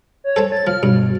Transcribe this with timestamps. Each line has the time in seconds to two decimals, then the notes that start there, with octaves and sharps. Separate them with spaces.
0.24 C#5
0.36 A4 C5 A5
0.52 A6
0.67 F3 F6
0.83 G2 B2